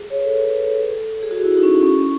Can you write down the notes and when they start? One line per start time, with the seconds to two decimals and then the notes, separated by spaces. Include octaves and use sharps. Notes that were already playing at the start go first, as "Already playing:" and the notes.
Already playing: G#4
0.10 C#5
0.18 B4
0.25 A4
0.38 B4
0.65 A4
0.77 A4
1.23 G#4
1.31 F#4
1.43 E4
1.57 D#4
1.63 C#4
1.71 D#4
1.83 C#4